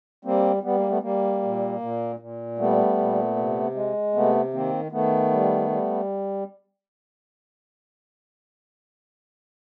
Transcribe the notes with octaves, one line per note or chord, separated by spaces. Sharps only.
G3 A#3 C4
G3 B3
A#3
A3 B3
G3 A#3
A#2
A#2
A#2
G3 A3 B3
A#2
C3
G#3
C3 A3 B3
D#3 A#3 C4
D#3 A3 B3
G3
G3